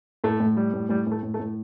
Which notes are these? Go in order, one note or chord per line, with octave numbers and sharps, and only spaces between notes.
A2 A3
A2
G3
A2
A2 G3
A2 A3
A2
A3
A2